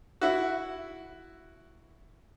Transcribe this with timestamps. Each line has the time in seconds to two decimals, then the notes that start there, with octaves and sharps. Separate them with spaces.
0.21 E4 F#4